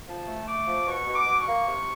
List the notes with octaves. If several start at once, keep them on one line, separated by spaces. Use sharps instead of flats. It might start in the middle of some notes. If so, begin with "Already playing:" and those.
F3 A5
A3
A3 D6
F3
B2 C#6
B2
D6
B2
C#6
A#3
C3